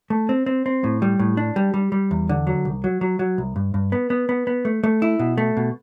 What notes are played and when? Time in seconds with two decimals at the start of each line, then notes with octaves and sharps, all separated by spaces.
0.10 A3
0.29 C4
0.46 C4
0.66 C4
0.84 A2
1.02 G3
1.19 A2
1.37 D4
1.56 G3
1.74 G3
1.92 G3
2.11 E2
2.29 D3
2.47 F#3
2.65 C2
2.84 F#3
3.01 F#3
3.19 F#3
3.38 C2
3.56 G2
3.74 G2
3.92 B3
4.10 B3
4.29 B3
4.47 B3
4.65 A3
4.84 A3
5.02 E4
5.19 B2
5.38 A3
5.57 B2